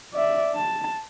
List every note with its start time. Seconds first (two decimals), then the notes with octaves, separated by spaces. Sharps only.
0.14 D5 E5
0.55 A5